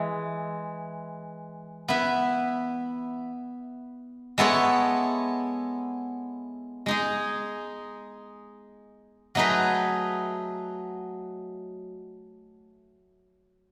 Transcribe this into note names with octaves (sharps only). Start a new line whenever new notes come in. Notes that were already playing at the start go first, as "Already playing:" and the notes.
Already playing: E3 G#3
B3 E4 B4 E5
G#3 B3 E4 A4 C#5
G#3 D#4 G#4
F#3 A3 D#4 G#4 B4